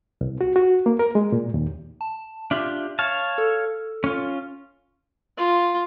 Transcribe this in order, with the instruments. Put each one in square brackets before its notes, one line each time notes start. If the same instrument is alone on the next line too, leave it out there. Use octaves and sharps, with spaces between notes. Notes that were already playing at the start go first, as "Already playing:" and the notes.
[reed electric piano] C2
F#4
F#4
A#3
A#4
G#3
A#2
D#2
[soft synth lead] A5
[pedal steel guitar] D4 F4 G4 [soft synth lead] E5
[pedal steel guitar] C#5 F5 A5
[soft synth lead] A4
[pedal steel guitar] C#4 F4
[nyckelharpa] F4